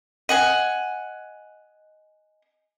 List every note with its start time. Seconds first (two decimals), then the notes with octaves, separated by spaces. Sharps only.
0.29 D#5 F#5 G#5